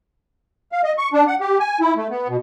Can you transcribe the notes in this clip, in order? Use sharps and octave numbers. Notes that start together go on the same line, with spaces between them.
F5
D#5
C#6
D4
F#5
G4
G#5
E4
A3
B3
B2